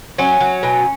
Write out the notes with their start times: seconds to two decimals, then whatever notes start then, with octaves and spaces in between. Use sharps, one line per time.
0.18 F#3 C#4
0.40 F#3
0.63 B2